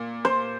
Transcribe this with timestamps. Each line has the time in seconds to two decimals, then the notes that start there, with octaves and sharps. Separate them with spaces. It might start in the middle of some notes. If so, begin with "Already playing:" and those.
Already playing: A#2
0.25 C5